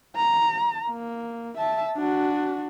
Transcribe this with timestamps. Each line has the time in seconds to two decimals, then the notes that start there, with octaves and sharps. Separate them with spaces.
0.17 A#5
0.89 A#3
1.58 E5 A5
1.97 D4 F#4